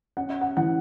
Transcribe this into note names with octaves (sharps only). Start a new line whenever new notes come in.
C#4 F#5
E5
F#5
E3 F#5